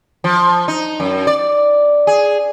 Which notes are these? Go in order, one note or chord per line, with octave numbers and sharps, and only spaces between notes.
F3
D#4
F#2
D5
G#4